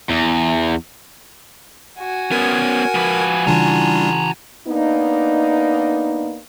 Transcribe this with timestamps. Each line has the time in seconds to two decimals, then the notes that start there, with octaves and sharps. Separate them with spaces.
0.10 E2
1.99 F#4 G#5
2.32 B3 C#4 A#4 G#6
2.95 F3 B4
3.47 C#3 E3 G3 D4 F4 A5 A#5
4.68 A#3 B3 D4 D#4